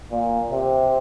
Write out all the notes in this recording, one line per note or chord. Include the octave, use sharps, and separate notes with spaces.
A#2
C3